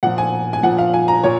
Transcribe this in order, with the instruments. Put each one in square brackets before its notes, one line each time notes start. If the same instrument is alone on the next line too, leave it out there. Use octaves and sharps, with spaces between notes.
[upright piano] A#2 F3 F#5
G#5
G#5
A#2 F3 F#5
F5
G#5
A#5
A#2 C#5